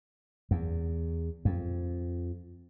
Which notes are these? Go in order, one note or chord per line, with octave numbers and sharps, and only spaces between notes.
E2
F2